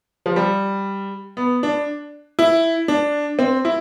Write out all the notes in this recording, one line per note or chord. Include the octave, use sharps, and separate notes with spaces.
F3
G3
B3
D4
E4
D4
C4
E4